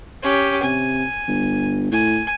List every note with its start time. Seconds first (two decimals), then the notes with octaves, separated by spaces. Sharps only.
0.22 C#4 G4
0.63 C3 G#5
1.28 G1
1.92 A2 G#5